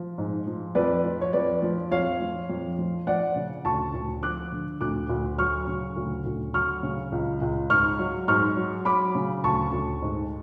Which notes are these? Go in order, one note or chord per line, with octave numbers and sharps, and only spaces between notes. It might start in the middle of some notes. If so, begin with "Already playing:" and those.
Already playing: F3
G#2
F3
F2 B4 D5
F3
C#5
F2 B4 D5
F3
F2 C#5 F5
F3
F2
F3
F3 D5 F#5
C#3
D2 A5 C#6
D2
F3 D6 F#6
D3
D2 D6 F#6
D2
F#3 C#6 F6
C#3
D2
D2
F#3 C#6 F6
C#3
C#2
C#2
G#2 C#6 F6
F#3
G#2 C#6 F6
F#3
F#3 B5 D6
C#3
D2 A5 C#6
D2
G#2